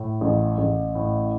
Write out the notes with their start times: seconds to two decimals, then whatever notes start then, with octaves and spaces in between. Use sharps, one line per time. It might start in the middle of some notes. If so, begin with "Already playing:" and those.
Already playing: A2
0.21 A1
0.58 A1
0.95 A2